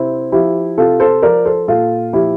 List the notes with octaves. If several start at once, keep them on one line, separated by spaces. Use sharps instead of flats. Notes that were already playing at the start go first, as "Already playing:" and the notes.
Already playing: C3 C4 E4
F3 E4 G4
C3 F4 A4
A4 C5
F3 A#4 D5
A4 C5
A#2 F4 A4
F3 E4 G4